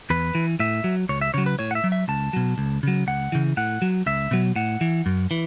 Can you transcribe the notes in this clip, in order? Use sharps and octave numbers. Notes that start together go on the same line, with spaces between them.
E2 B4
E3
A2 E5
F#3
C#2 C#5
E5
C#3 F#3 C#5
B4
A2 C#5
F#5
E5
F#3
E5
C#2 A5
B2 F#3
C#2
C#3 F#3
C#2 F#5
C#3 E3
A2 F#5
F#3
C#2 E5
B2 F#3
A2 F#5
E3
F#2
E3